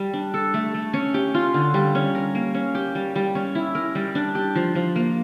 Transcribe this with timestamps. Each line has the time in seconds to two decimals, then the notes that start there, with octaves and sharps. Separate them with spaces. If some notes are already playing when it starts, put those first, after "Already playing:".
Already playing: G3
0.13 D4
0.34 A4
0.54 A3
0.74 A3
0.94 C#4
1.14 G4
1.34 F4
1.54 D3
1.74 G3
1.95 C#4
2.15 A#4
2.35 A#3
2.55 C#4
2.75 G4
2.95 G3
3.16 G3
3.35 C#4
3.55 E4
3.75 A#4
3.95 G3
4.15 D4
4.35 G4
4.55 F3
4.75 F3
4.96 A#3